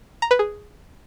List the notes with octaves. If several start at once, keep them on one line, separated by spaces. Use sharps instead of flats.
A#5
B4
G#4